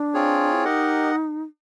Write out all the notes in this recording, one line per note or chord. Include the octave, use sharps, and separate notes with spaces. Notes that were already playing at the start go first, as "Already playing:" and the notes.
Already playing: D4
C4 F4 G#4 C#5
E4
D#4 G4 A#4 D#5 F#5